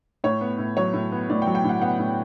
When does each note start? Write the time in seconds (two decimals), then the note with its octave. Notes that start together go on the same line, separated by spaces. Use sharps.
0.24 A2 C#5
0.41 B3
0.58 A2
0.77 F#3 C#5
0.93 A2
1.12 B3
1.29 A2 D5
1.42 G5
1.47 F#3
1.55 G5
1.64 A2 F#5
1.81 B3 F#5
1.99 A2